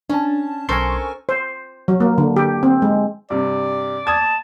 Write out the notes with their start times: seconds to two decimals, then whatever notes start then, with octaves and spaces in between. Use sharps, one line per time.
0.10 C#4 D4 A5
0.69 B1 A4 A#4 C5 G#5 C6 C#6
1.29 C5
1.88 F#3
2.00 A#3
2.18 D3
2.36 G4
2.63 C4
2.82 G#3
3.30 G2 C3 D5
4.07 A5 D#6 G#6